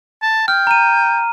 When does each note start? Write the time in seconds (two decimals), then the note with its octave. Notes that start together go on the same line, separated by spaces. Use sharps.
0.22 A5
0.48 G5 F6
0.67 A#5 D#7